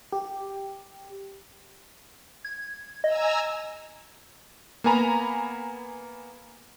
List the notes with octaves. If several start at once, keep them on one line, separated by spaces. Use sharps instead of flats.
G4
G#6
D#5 G#5 A#5 E6
A#3 B3 G#5 A#5 B5